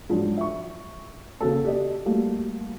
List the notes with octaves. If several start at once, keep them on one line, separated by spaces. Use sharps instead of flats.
G#2 F3 F#3 D4
E5 C#6
C#3 A#3 F#4 A4
G4 D5 D#5
G3 A3 A#3 F#4